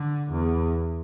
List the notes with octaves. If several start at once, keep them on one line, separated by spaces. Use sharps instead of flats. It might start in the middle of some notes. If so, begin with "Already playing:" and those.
Already playing: D3
E2